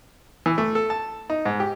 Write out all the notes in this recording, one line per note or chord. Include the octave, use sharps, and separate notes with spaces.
E3
A3
A4
A5
D#4
G#2
G4